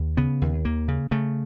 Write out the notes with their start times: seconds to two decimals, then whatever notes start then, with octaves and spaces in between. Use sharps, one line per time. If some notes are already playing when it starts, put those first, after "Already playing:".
Already playing: D#2
0.17 C#3 B3
0.42 D#2
0.65 D#2 A#3
0.88 C#3
1.11 C#3 A3